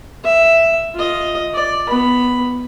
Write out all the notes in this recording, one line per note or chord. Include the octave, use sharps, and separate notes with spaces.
E5
F4 D#5
D5
B3 B5